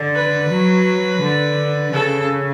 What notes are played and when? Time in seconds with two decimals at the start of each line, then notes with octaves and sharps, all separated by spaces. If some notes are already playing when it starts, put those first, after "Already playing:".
Already playing: D3
0.15 B4
0.50 F#3
1.22 D3
1.92 C#3 A4